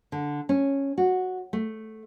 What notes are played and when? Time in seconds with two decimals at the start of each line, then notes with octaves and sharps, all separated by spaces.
0.12 D3
0.49 C#4
0.98 F#4
1.53 A3